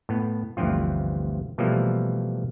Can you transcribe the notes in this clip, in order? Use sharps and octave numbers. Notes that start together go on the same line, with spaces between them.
A2 B3
G1 D2 E3 F3 C4 F4
B2 E3 F3 G3 A3 A#3